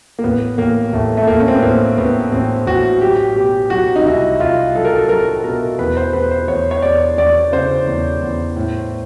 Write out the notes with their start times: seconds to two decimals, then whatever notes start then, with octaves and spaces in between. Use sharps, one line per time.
0.19 A#3
0.24 A1 B3
0.58 A1 A#3
0.93 A1 A3
1.17 A3
1.27 A1 A#3
1.40 C#4
1.48 C4
1.55 B3
1.62 A1 A#3
1.98 A1 B3
2.32 A1 C4
2.67 A1 F#4
3.01 F#3 G4
3.36 B2 G4
3.70 F#3 F#4
3.96 D#4
4.05 C2 E4
4.40 C2 F4
4.75 F#3 A4
4.85 A#4
4.96 A4
5.09 F#3 A#4
5.44 B2 A#4
5.79 E2 B4
5.97 C5
6.13 E2 B4
6.31 C5
6.48 E2 C#5
6.71 C#5
6.82 E2 D5
7.18 E2 D5
7.52 C#3 C5
7.87 E2
8.22 E2
8.56 A2